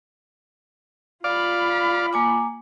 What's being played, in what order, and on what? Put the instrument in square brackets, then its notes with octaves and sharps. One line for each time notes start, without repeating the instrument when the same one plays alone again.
[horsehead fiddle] F4 B5 [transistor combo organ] D5 F5
[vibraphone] A#3 G#5 D6